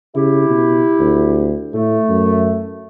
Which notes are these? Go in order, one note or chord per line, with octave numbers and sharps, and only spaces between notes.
C#3 E4 G4
B2
D2
A2 A3
F#2